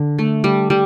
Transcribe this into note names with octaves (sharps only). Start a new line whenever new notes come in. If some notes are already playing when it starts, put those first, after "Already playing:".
Already playing: D3
A3
G3
G3